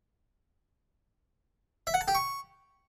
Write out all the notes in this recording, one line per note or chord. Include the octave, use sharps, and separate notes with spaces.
E5
F#5
A5
G4
C#6